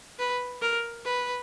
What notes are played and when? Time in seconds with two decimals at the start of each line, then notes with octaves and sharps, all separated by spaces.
0.19 B4
0.62 A#4
1.05 B4